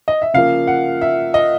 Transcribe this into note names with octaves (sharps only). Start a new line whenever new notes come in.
D#5
E5
C#3 F3 A#3 F5
F#5
E5
D#5